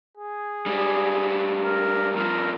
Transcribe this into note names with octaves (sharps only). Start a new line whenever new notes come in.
G#4
G#2 G3
A#4
G2 F3 A#4